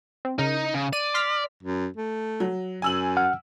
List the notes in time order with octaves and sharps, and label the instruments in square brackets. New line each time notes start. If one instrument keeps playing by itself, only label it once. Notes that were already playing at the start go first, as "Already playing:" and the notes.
[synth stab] C4
[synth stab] C#3 A#4 [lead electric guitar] D#4
[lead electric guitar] C#3
[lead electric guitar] D5 [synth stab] D#7
[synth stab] C6 F6 B6
[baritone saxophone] F#2
A3
[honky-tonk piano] F#3
[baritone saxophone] F#2 [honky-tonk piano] G#5 E6 F#7
[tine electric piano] F#5 F6